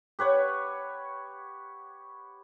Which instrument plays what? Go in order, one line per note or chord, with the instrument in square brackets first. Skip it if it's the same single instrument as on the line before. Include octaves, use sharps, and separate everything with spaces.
[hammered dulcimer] G4 B4 C#5 F#5